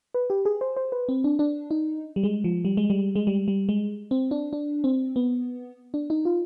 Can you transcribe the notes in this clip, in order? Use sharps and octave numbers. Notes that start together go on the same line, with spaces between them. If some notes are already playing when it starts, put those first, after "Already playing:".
B4
G4
G#4
C5
C5
B4
C4
D4
D4
D#4
G3
G#3
F3
G3
G#3
G3
G#3
G3
G3
G#3
C4
D4
D4
C4
B3
D4
D#4
F4